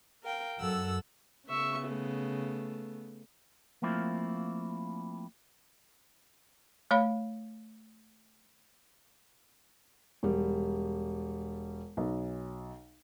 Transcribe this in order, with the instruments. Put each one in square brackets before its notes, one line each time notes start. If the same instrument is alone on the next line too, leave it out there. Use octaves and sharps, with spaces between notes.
[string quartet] A#4 F5 G5
[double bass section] F#2 [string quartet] A4 F#5 E6
[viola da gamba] C#3 B3 [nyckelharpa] E5 C#6
[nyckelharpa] A3
[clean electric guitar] F3 A3 A#3 C4 E4 F4
[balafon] A3 C#5 F5 B5
[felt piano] E1 G3
B1